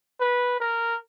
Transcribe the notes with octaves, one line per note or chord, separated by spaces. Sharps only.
B4
A#4